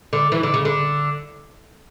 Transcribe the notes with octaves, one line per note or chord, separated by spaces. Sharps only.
D3
E3
D3
C#3
D3